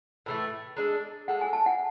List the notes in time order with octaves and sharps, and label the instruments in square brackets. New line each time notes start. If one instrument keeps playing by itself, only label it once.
[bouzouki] A2 E3 A3
G#3 D4 A4
[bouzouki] G#3 D4 A4 [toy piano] F#5
[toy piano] G#5
A5
F#5